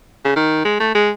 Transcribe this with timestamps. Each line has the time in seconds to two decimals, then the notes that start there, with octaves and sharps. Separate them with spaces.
0.25 C#3
0.36 D#3
0.65 G#3
0.80 A3
0.95 G#3